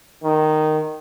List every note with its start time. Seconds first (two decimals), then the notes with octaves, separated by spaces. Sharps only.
0.23 D#3